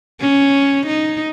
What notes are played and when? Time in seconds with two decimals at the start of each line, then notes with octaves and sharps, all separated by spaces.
0.20 C#4
0.87 D#4